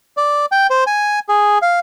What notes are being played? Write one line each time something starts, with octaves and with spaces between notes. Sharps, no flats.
D5
G5
C5
G#5
G#4
F5